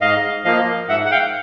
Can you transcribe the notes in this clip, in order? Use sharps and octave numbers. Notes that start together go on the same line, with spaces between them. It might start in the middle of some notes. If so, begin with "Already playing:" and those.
G#2 D#5 F5
F3 A#3 D#5 F5
G#2 E5 F#5
F#5
F5 G5